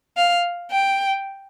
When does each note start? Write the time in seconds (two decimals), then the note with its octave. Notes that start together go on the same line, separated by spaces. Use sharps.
0.17 F5
0.71 G5